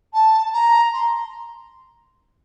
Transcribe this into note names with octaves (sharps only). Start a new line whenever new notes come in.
A5
A#5
C6